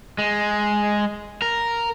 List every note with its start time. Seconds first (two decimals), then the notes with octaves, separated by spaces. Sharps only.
0.18 G#3
1.42 A#4